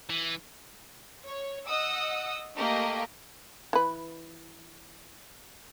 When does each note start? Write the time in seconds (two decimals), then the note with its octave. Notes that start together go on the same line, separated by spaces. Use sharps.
0.09 E3
1.26 C#5
1.65 D#5 F#5 D#6 E6
2.56 A3 A#3 G4 D#5
3.73 E3 B4